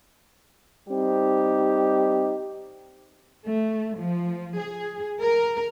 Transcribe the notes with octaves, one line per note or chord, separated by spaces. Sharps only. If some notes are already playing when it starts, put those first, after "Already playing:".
G3 C4 D#4 G4
A3
F3
G#4
A#4